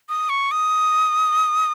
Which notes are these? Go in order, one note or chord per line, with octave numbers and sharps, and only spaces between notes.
D#6
C#6
D#6